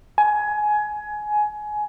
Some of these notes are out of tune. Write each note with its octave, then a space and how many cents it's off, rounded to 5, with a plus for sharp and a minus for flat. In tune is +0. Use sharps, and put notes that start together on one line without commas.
G#5 +20